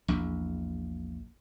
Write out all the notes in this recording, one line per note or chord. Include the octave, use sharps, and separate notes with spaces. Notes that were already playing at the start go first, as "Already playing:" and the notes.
A#1 E2